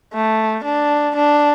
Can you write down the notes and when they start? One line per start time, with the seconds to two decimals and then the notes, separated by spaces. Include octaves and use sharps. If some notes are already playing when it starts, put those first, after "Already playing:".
0.14 A3
0.64 D4
1.16 D4